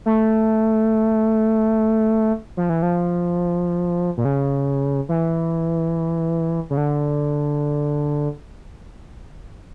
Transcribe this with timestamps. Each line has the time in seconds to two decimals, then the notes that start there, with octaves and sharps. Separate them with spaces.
0.06 A3
2.57 F3
2.70 E3
2.82 F3
4.17 A#2
4.25 C#3
5.09 E3
6.70 C#3
6.77 D3